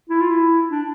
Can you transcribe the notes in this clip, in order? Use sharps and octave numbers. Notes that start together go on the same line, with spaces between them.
E4
F4
E4
D4